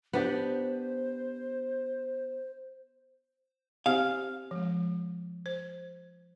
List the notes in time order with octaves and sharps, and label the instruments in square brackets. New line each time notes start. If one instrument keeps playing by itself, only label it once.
[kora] B3 D4 G4 [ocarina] C5
[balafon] C4 G4 C5 [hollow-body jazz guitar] F5
[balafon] F3 G#3
C5